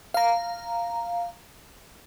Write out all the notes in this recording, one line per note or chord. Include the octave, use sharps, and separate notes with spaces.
F5 A#5